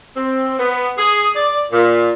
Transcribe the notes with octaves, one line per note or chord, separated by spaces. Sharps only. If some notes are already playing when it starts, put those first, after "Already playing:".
C4
B3
G#4
D5
A#2